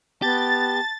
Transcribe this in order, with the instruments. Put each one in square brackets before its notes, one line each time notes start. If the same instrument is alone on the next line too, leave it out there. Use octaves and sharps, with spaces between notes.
[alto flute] B3 [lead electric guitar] G4 [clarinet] A5 [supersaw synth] A6